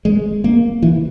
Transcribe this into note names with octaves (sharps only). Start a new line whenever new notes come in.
G#3
A#3
E3